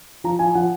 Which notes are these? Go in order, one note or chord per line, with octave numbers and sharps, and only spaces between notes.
F3 A#5
F3 G#5
F3 F#5